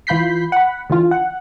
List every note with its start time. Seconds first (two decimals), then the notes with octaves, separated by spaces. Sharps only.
0.07 E3 F4 B5 G6 B6 C7
0.52 F#5 B5
0.90 D3 E3 F4
1.11 F#5